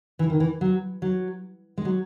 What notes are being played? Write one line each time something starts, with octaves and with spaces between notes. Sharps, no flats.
E3
D#3
E3
F#3
F#3
G#3
F#3